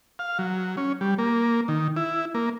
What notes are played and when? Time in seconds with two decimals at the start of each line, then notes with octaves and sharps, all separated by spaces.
0.19 F5
0.39 F#3
0.77 C#4
1.01 G3
1.18 A#3
1.68 D#3
1.96 E4
2.34 A#3